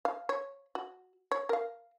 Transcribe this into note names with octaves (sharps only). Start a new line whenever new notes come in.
F5
C#5
F#4
C#5
A#4 F5